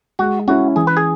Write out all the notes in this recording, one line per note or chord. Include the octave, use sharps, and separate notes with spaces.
G#3 F#4
C#4 E4 F#4
E3 G#4
B4
G#4